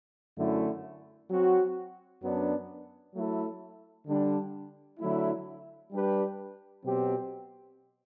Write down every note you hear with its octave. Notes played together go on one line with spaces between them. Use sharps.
F#2 D3 A3 E4
F#3 C4 F#4
F#2 F#3 B3 D4
F#3 A3 E4 A4
D3 G3 D4
D3 F#3 A3 E4
G3 D4 G4 B4
B2 F#3 C4 G4